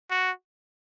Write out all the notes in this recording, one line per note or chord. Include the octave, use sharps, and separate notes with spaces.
F#4